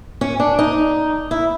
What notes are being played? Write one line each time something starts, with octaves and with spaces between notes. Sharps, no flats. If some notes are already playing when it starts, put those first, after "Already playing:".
C#4
D4
D#4
E4